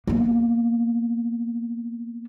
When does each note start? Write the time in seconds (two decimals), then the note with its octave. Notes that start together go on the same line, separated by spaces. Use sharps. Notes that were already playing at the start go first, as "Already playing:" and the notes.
0.07 A#3 B3